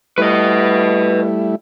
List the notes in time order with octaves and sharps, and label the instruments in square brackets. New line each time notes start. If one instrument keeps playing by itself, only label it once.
[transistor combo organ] G3 A3 E4 [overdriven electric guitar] B4 D#5